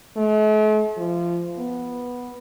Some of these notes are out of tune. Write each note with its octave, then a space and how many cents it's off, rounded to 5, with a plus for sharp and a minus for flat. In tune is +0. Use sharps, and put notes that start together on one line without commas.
A3 -45
F3 -20
B3 -5